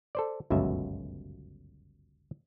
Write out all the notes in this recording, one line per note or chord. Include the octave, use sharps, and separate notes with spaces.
A4 C5 D5
G1 C#2 F#2 B2 E5